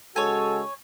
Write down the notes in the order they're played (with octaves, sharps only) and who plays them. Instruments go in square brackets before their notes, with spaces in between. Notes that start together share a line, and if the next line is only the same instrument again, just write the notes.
[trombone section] C#3 G#3 F#4 [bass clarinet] A4 [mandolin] C#5 G#5